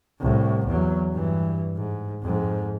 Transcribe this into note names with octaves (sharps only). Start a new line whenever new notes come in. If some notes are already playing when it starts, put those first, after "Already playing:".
C2 A2
E2 F#3
G2 E3
G#2
F2 G#2